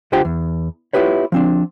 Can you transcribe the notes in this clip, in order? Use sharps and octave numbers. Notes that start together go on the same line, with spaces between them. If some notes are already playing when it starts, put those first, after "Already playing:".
D2 D3 F4 G4 C5 G5
E2
B3 E4 F4 G4 B4 C#5
F3 C4 D4